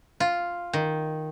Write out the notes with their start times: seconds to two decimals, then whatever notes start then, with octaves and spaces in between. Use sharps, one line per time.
0.20 F4
0.73 D#3